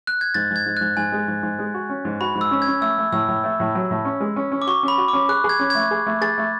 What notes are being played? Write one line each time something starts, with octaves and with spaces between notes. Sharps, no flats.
F#6
G#6
G#2 A6
G#2
G#6
G#2
G#2 F#6
G#2 G#5
G#3
G#2
G#2
G#3
F#4
C#4
G#2
F#4 B5
G#2
E6
C#4
G#6
C#4
A3 E6
A3
A2 E6
A2
A3
A2
F#3
A2
C#4
G#3
C#4
C#4
D6
F#4 C#6
C#4
B5
F#4
C#4 D6
G#4 F#6
G#4
G#6
C#4
A3 G#6
G#4
A3
G#4 A6
A3